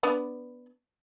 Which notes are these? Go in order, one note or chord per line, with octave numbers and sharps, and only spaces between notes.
B3 D4 B5